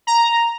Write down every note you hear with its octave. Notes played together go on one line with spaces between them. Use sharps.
A#5